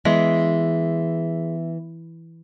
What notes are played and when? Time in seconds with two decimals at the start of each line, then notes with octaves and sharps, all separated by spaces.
0.05 E3 G#3 B3 E5 B6